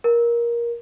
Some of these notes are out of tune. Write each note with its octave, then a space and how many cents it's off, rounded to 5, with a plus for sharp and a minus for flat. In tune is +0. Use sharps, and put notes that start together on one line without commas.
A#4 +15